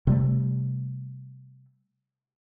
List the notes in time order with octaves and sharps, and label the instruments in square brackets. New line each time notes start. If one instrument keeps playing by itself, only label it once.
[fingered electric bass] C3 G3 A3